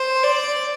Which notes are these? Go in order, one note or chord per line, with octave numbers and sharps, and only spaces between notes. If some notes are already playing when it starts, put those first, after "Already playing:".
Already playing: C5
D5